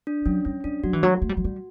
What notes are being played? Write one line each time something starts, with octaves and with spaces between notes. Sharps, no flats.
D4
F#3 C#4
G3 C#4
G3 D4
F#3 F#4
E3
F#3
A3
G3
F#3
G3